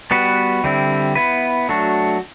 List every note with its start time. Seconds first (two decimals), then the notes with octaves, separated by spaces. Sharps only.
0.11 G3 B3 F#4 B4
0.64 D3 G3 C4 E4
1.15 B3 E4 B4
1.69 F#3 A3 D4 F#4